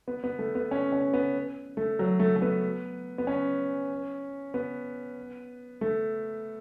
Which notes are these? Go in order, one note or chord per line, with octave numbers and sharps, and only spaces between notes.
B3
B3
A3
B3
C#4
C#4
B3
A3
F#3
A3
A3
B3
B3
C#4
B3
A3